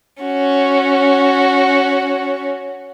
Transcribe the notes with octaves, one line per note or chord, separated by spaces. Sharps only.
C#4 F#4